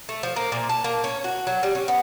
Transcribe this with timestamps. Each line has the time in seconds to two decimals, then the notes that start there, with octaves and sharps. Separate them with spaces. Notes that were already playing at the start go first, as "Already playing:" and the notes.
0.09 A3
0.23 F3
0.36 A#3
0.52 A#2
0.69 A5
0.84 A#3
1.04 C#4
1.24 F#4
1.47 F#3
1.63 G3
1.75 C#4
1.88 B3